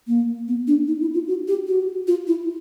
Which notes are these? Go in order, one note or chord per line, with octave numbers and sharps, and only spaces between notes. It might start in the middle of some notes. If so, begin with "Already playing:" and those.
A#3
B3
D4
D#4
E4
F4
F#4
G4
F#4
F4
E4